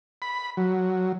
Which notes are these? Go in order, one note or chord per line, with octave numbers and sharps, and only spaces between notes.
B5
F#3